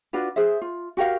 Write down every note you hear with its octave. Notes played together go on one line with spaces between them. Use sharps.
D4 F4 F#4 B4
G#4 C5 E5
F4
F#4 G4 A#4 F5